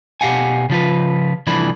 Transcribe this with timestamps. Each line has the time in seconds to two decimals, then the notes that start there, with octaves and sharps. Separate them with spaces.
0.21 B2 G4 F5 F#5 G#5
0.70 C#3 F3 F4 B4
1.47 C2 E3 F3 A3 D4 B5